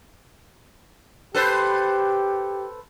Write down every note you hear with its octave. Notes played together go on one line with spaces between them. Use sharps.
G4 A4 B4 C5